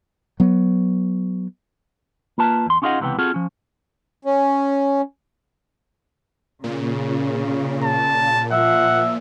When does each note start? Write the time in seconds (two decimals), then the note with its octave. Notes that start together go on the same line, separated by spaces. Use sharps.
0.40 F#3 B3
2.38 A#3 F4 B4 A5
2.66 E2 C6
2.82 C#4 D#4 F4 G#4 D#5 F#5
3.00 C#2 C3 E3 B3 G5
3.19 C4 F4 F#4 G#4 A4
3.34 F3 C#4
4.25 C#4
6.64 A#2 C#3
7.84 A5
8.52 F3 E5 F#5